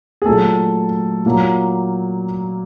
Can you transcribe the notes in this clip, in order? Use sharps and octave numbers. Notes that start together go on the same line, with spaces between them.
G#4
A#2 F#3 A3 A4
A#2 F#3 A#3